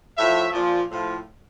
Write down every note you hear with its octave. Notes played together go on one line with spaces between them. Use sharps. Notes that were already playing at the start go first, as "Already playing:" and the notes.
A2 F3 C#5 E5
A#2 F3
A2 F3